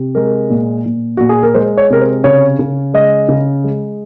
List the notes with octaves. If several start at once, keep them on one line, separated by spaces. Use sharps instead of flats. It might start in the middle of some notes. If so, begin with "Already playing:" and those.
Already playing: C3
G#3 A#4
A#2
A#2
A#2 F#4
G#4
A#4
G#3 C5
C#5
C3 A#4
C5
C#3 C#5
C#3
G#3 D#5
C#3
G#3